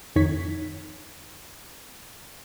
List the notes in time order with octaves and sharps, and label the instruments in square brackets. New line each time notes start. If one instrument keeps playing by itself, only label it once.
[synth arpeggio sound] F2 D#3 D#4 C#5 G#6 B6